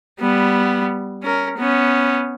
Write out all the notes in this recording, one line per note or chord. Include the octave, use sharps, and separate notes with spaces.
G3 B3
C#4 A#4
B3 C#4